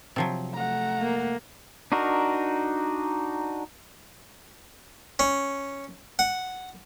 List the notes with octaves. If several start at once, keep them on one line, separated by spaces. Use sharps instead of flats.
C3 F3 F#3
A3 F#5 A#5
A#3
D4 D#4 F#4 A#4
C#4
F#5